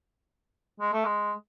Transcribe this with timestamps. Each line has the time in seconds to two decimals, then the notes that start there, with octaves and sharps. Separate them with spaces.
0.80 G#3
0.93 A3
1.05 G#3